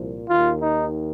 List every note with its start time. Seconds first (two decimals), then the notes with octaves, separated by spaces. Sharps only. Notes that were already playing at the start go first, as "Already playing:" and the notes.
Already playing: C2 A#2 F3
0.28 D#2 D#3 F4
0.61 D#4